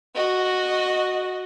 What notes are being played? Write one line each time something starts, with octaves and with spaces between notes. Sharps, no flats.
F#4 D#5